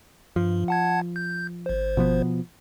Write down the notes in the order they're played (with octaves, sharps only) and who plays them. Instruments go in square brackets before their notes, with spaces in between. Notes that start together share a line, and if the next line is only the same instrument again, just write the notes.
[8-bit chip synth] G2 [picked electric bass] F3
[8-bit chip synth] F#5 A5 G#6
G6
G#1 C5
[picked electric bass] B2 F3 B3